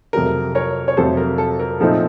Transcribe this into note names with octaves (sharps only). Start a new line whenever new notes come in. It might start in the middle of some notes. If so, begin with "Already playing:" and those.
F2 C3 F#3 A3 A#4
A#4 C#5
C#5
F2 C3 F#3 A3 A4 C5
A#4
A4
A#4
A#2 F3 A3 C4 D#4 A4